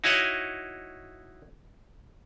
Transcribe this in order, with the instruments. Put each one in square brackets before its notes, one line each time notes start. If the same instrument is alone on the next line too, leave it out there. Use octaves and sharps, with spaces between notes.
[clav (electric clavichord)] D#4 E4 F#4 C#5 D#5 F#5